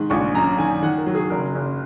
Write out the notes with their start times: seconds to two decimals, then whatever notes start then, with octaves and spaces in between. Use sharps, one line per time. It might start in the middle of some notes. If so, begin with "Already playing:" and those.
Already playing: G#2 D#3
0.10 A#1 C#6
0.35 F#2 A#5
0.58 D#3 G#5
0.83 D#3 F#5
0.98 A#4
1.07 F#3
1.15 G#4
1.30 F#1 A#4
1.55 F#1